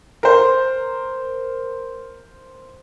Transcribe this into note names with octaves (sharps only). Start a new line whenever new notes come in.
A#4 C5